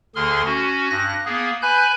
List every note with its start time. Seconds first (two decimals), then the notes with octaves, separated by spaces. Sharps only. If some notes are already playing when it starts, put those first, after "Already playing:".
0.16 D2 D3 G#4 C6 F6
0.46 C#4 F#4
0.90 G2 F#6 A#6
1.26 A#3 B3 G#4
1.62 B4 G#5 B5 F#6 G6